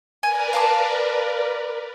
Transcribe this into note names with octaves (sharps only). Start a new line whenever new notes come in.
A#4 B4 D5 G#5
F5 A5 D6